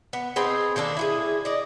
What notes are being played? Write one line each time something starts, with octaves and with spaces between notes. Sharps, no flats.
B3
C4 D#4 G#4 B4
D#3 A#3 D4 A4
E4 F#4 G#4
D5 D#5